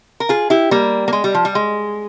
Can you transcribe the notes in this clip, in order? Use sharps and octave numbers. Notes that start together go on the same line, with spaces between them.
A#4
F4 G#4
E4 G4
G3 A#3
A#3
G#3
G3
F3
G3
G#3